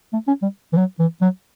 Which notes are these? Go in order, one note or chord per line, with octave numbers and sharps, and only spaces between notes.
A3
C#4
G3
E3
F#3
E3
F#3